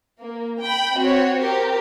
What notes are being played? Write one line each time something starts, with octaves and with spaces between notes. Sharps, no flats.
A#3
G5 B5
C4 F#4 C#5
G4 A#4 C5